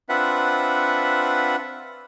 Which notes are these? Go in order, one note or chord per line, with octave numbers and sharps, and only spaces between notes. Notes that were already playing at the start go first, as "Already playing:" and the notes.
C4 D4 F4 B4 E5 F#5